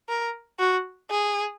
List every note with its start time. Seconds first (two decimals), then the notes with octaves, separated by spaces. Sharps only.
0.09 A#4
0.59 F#4
1.10 G#4